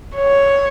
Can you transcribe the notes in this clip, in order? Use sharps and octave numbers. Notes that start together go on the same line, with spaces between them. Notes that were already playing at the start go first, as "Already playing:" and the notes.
C#5